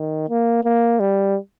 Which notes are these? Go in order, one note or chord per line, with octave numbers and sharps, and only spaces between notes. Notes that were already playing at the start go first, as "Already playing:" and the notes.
Already playing: D#3
A#3
A#3
G3